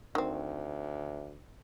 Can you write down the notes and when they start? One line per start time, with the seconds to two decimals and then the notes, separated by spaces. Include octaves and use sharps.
0.15 D2 D#3 C4